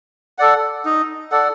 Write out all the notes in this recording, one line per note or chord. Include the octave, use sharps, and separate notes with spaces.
A4 D5 F#5
D#4
A4 D5 F#5